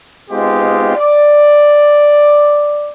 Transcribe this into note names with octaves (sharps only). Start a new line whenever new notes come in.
G#3 B3 C4 D#4 F4 G4
D5